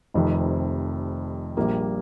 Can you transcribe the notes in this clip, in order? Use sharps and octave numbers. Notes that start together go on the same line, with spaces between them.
F1 F2 C3 D#3
A#1 A#2 G3 A#3